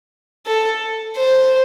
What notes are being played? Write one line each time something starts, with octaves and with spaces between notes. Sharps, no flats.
A4
C5